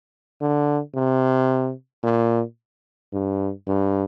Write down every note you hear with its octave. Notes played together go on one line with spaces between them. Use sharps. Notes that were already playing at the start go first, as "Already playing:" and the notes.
D3
C3
A#2
G2
G2